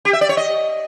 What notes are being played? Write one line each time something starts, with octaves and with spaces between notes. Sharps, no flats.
G4
E5
D5
C#5
D#5